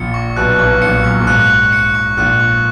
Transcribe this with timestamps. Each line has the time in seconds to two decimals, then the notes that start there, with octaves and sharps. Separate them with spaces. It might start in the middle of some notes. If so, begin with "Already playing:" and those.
Already playing: A#1 A#2 C#7
0.14 C#6
0.36 B1 B2 F#6
0.59 B1 B2 C#6
0.82 A#1 A#2 C#7
1.04 F#2 C#6
1.21 A#2
1.27 G#2 F#6
1.50 C#6
1.73 C#7
1.95 C#6
2.17 A#1 A#2 F#6
2.40 C#6